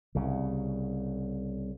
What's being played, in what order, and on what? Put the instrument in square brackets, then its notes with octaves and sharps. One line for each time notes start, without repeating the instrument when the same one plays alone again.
[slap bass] C2 C#3